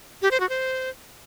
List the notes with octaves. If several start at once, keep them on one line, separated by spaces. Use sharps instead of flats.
G4
C5
F#4
C5